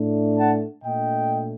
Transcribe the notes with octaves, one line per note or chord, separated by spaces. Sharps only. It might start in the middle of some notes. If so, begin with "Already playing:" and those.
Already playing: A2 A3 D4
F#5 A5
A#2 A3 D4 D#5 G5